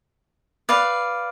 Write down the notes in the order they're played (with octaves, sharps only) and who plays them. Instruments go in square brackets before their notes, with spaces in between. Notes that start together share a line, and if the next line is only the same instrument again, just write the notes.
[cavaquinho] B4 D5 F5